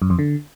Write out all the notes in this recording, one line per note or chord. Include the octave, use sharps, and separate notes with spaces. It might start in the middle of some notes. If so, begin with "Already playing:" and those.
F#2
F2
D3